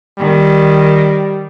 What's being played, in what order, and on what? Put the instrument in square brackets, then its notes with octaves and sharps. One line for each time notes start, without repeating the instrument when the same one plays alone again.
[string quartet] D#3 [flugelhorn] G3